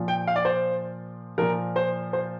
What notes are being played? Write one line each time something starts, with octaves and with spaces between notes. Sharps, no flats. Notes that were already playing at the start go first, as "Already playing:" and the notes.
Already playing: A#2 F3
G5
F5
D5
C5
A#2 F3 A#4
C5
C5